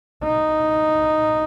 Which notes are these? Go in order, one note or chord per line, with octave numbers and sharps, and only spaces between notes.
D#4